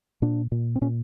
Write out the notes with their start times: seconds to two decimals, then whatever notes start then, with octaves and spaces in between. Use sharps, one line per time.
0.22 A#2 D4
0.52 A#2
0.76 C4
0.81 A#2 C#4